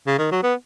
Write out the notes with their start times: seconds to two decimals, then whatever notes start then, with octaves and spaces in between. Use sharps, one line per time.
0.07 C#3
0.18 D#3
0.32 F#3
0.43 B3